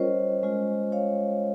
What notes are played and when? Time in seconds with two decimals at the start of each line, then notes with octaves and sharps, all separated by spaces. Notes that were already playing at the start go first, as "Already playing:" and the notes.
Already playing: G3 C#4 F4 A#4 C5 C#5 D#5
0.43 G#3 C#4 F4
0.92 C#5 F5